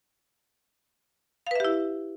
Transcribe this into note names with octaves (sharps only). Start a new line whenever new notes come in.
E4 G4 B4 E5 F5